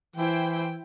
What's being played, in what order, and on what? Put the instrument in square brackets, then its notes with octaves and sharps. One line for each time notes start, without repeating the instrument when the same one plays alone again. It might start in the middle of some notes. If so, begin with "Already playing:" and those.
[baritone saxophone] E3 [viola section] E4 C5 G5